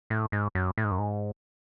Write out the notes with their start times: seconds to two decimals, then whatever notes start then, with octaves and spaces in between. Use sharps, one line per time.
0.10 A2
0.32 G#2
0.55 F#2
0.78 A2
0.84 G#2
0.91 F#2
0.99 G#2